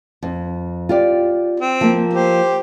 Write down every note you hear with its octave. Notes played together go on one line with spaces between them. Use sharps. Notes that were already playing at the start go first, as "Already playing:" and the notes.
F2
F4 G4 D5
C4
F3 A#3
G4 C5